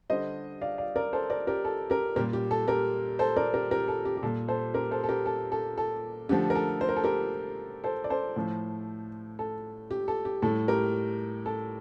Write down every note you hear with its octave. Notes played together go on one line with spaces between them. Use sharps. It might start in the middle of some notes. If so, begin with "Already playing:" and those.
D3 G3 C5 D#5
D5 F5
D5 F5
A#4 D5
A4 C5
A#4 D5
G4 A#4
A4
G4 A#4
A#2 G3 G4 A#4
G4
A4
G4 A#4
A4 C5
A#4 D5
G4 A#4
G4 A#4
A4
G4
G4
A#2 G3 A4
A4 C5
G4 A#4
A4 C5
A4
G4 A#4
A4
A4
A4
D3 F3 A3 G4
A#4
A4
C5
A#4
A4
G4 A#4
A4 C5
D5
A4 C5
A2 F3 A3
A4
G4
A4
G4
A2 G3 A4
G4 A#4
A4